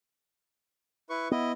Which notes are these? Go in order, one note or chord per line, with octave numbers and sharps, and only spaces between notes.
E4 B4 C#6
B3 E4 D#5